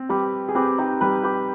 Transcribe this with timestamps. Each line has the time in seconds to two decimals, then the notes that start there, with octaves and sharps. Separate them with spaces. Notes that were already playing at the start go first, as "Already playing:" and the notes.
Already playing: C4
0.09 G3 G4 B4
0.48 G#4
0.55 C4 G4 B4
0.78 D#4 G4
1.01 G3 G4 B4
1.24 G4 B4